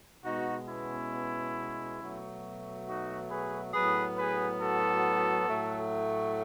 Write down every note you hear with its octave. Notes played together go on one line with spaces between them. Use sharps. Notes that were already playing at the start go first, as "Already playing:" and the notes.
B2 G#3 B3 D#4 F#4
C#4 E4
B2 F#3 A3
D#4 F#4
G#4 B4
A2 F#3 B3 G#4 B4
G#4 B4
F#4 A4
A2 F#3 A3